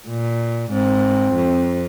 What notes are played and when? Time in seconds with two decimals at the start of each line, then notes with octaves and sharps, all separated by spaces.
0.08 A#2
0.71 G#2 C4
1.34 F2